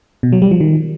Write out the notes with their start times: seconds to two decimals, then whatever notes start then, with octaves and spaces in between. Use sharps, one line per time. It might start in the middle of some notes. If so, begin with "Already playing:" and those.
0.23 B2
0.32 F#3
0.42 G3
0.51 F3
0.61 D#3